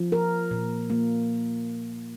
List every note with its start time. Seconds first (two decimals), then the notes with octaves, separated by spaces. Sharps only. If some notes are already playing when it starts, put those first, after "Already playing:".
Already playing: F3
0.12 A#4
0.51 A#2
0.90 A#3